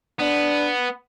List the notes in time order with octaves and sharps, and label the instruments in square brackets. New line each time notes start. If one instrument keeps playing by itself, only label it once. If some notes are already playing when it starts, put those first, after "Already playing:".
[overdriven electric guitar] B3 [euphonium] D4